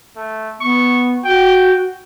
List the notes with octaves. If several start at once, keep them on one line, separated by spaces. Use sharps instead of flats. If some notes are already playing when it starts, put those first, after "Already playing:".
A3
B3 C#6
F#4 G5